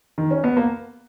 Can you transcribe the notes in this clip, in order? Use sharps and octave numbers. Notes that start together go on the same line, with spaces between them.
D#3
C#4
B3
A#3